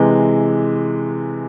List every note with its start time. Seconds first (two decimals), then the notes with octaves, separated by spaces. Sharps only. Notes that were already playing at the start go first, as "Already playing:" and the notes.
Already playing: C3 E3 G#3